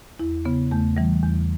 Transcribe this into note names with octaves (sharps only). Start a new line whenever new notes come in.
E2 E4
C#3 B3
E2 A3
E3 G3
E2